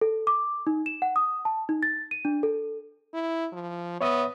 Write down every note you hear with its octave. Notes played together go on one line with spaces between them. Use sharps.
A4
D6
D#4
E7
F#5
D#6
A5
D#4
A6
D#7
D4
A4
E4
F3
B3 C#5 E5 D#6